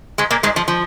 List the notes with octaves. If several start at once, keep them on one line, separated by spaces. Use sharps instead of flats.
G#2 G#3
A#2 A#3
G#2 G#3
F3
F3